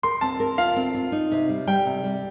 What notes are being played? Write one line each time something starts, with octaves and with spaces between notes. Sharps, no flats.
A#4 C6
C4 A5
A#4
F4 F5
C4
F4
D#4
C3
G3
G3 G5
C3
G3